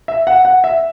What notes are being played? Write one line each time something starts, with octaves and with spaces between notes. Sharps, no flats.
E5
F#5
F#5
E5